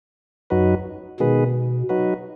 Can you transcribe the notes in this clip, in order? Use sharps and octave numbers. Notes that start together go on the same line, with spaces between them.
F#2 F#3 D#4 F#4 B4
B2 D#3 G#3 B3 G#4 B4
F#3 D#4 F#4 B4